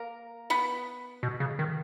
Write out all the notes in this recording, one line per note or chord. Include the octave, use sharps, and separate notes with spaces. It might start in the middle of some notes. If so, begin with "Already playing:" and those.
Already playing: A#3 A#4
B3 B4
B2
C#3
D#3